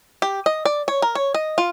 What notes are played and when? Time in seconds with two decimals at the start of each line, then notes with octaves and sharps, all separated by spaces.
0.22 G4
0.46 D#5
0.65 D5
0.88 C#5
1.02 A#4
1.15 C#5
1.34 D#5
1.58 F4